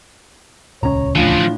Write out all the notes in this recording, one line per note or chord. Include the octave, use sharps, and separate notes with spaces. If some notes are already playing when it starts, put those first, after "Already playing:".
D#1 C#2 C#4 C#5 A#5
A2 E3 F3 D4 F4